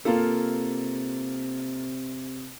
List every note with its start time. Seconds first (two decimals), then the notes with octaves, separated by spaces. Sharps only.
0.05 C3 A#3 F4 A4